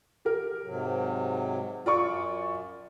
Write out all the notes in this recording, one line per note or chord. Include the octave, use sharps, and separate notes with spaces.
G4 A#4
G#2 C3 F#3
F#2 F4 D5 C#6